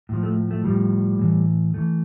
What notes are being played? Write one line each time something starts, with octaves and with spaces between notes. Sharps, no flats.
A2 F3
A3
A3
A2 F3 G3
A2 E3
A2 E3 A3